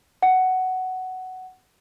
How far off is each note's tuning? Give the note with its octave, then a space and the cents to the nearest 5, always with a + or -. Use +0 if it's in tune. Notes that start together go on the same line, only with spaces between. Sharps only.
F#5 +10